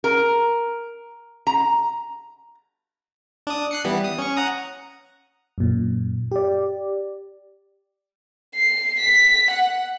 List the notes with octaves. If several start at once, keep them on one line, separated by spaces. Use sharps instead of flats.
A#4
A#5
D4 D#6
F#6 C7 C#7
E3 G3 B3
D#6
C#4 C#6
F#5 A#5 D#6
F#2 A#2
G4 D5
C7
B6
F#5